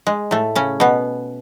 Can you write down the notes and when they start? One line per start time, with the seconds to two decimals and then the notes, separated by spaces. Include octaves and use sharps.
0.07 G#3
0.31 A2 A3
0.55 C#3 C#4
0.80 B2 B3